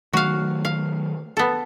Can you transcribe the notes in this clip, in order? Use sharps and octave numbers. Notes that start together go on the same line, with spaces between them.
D#3 F#3 A3 F#4 F5
F5
B3 A4